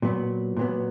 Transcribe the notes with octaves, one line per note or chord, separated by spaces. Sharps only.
A#2 F#3 B3
A#2 F#3 B3